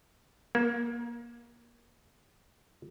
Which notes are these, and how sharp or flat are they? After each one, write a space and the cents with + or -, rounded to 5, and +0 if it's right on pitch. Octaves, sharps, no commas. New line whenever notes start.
A#3 +25